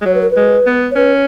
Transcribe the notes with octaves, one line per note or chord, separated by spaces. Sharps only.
G#3
F#3 C#5
B4
A#4
B4
G#3
B3
C#5
C#4 B4